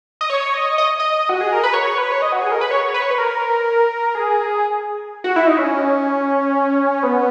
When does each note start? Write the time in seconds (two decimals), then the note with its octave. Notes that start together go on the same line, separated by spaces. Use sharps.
0.21 D#5
0.30 C#5
0.54 D#5
0.78 D#5
1.00 D#5
1.29 F#4
1.41 G#4
1.52 A#4
1.64 B4
1.74 C#5
1.98 B4
2.12 C#5
2.22 D#5
2.32 F#4
2.42 G#4
2.52 A#4
2.61 B4
2.71 C#5
2.94 B4
3.02 C#5
3.10 B4
3.18 A#4
4.15 G#4
5.24 F#4
5.36 E4
5.47 D#4
5.59 C#4
7.03 B3